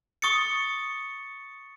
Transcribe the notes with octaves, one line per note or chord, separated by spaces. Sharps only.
C#6 D#6 A6 C#7